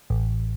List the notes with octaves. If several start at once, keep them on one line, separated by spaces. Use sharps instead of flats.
A1